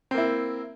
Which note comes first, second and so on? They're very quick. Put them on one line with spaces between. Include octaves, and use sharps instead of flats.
C4 A#3 E4